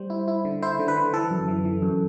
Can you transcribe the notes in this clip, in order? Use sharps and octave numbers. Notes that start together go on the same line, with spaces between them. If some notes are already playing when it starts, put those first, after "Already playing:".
Already playing: G3 C5
E4
E4
D3
E4 C5
D3
B4
D3
E3 A4
F#2
E3
E3
F#2